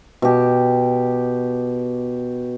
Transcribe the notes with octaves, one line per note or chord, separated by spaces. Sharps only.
B2 G4